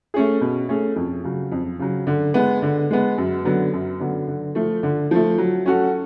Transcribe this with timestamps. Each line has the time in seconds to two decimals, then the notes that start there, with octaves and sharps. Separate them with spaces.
0.14 A3 C#4 G#4
0.41 B2
0.69 A3 C#4 G#4
0.96 F2
1.24 C#3 F#3
1.52 F2
1.79 C#3 F#3
2.07 D3
2.34 G#3 B3
2.62 D3
2.91 G#3 B3
3.18 F#2
3.45 D3 F#3 B3
3.73 F#2
4.00 D3 F#3 B3
4.28 D3
4.55 F3 A3
4.83 D3
5.11 F3 A3
5.38 F#3
5.66 C#4 F#4 A4